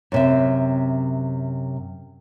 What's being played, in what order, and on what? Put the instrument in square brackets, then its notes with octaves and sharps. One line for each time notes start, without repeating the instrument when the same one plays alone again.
[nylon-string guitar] F#2 C3 E5